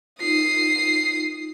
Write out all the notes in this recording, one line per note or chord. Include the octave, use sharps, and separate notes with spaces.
D#4 F4 D#6 C7